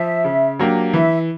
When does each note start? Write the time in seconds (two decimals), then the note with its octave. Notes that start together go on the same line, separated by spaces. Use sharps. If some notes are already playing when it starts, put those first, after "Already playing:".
Already playing: F3 E5
0.24 C#3
0.59 F#3 A#3 D4 G4
0.93 E3 E5